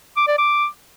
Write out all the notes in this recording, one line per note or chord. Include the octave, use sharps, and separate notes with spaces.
D6
D5
D6